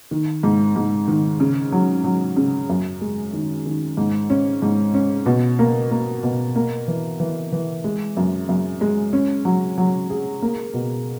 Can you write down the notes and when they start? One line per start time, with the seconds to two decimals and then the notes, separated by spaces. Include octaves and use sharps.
0.11 D#3
0.43 G#2
0.76 G#2
1.08 D#3
1.40 C#3
1.72 F#3
2.04 F#3
2.36 C#3
2.69 F#2
3.01 G#3
3.33 D#3
3.66 D#3
3.97 G#2
4.30 C#4
4.62 G#2
4.94 C#4
5.26 B2
5.59 A#3
5.91 A#3
6.23 B2
6.56 A#3
6.88 E3
7.20 E3
7.52 E3
7.84 G#3
8.17 F#2
8.49 F#2
8.81 G#3
9.13 C#4
9.45 F#3
9.78 F#3
10.10 G#4
10.42 A#3
10.74 B2